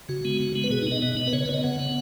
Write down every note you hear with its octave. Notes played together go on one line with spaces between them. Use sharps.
C#3 F#4
G#3 B3
C#3
G#3 B3
B4
B2 G#4
D#4
B3 D#5
B2 D#5
B3 D#5
B4
C#3 C#5
B4
B3 C#5
D#5
C#3 F#5
B3